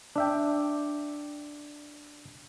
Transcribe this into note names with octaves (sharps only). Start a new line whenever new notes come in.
D4 E5 G5